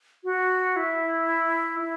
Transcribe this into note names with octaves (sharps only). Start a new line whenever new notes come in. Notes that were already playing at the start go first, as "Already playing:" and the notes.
F#4
E4
E4